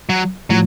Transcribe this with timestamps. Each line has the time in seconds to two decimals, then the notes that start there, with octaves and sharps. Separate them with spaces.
0.09 F#3
0.50 A2 F3 F#3